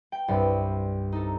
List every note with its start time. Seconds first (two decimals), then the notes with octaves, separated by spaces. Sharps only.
0.12 G5
0.28 C2 G2
1.12 D#4 A4